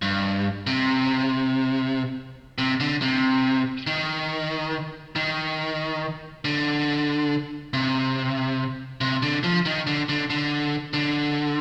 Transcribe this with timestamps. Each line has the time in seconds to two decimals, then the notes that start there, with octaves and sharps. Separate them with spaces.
0.02 G2
0.67 C3
2.58 C3
2.80 D3
3.02 C3
3.87 D#3
5.16 D#3
6.45 D3
7.73 C3
9.01 C3
9.23 D3
9.44 F3
9.66 D#3
9.87 D3
10.09 D3
10.30 D3
10.94 D3